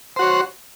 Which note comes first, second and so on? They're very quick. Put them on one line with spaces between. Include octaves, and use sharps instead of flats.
C5 F#4 C#5